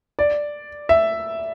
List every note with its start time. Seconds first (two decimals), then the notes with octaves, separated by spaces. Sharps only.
0.19 D5
0.89 E5